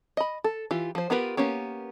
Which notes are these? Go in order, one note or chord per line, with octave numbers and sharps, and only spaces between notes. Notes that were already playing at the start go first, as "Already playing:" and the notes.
D#5 B5
A4
E3 F4 G4
F3 C5
B3 F4 G4 A#4 B4
A#3 B3 C#4 G4